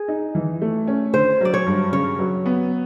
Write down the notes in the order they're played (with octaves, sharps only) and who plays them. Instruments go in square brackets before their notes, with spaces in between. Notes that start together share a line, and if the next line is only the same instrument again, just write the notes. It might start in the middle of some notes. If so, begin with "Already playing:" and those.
Already playing: [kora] G#4
[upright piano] D#4
E3
A3
C#4
[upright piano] D3 [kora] C5
[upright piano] F#3 [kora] D5
[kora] C#5
[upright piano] G2
[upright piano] C#3 [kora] C#5
[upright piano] F#3
B3